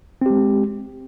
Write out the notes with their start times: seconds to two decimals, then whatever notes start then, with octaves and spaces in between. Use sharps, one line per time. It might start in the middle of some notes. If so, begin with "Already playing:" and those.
0.22 C4
0.26 G4
0.30 G#3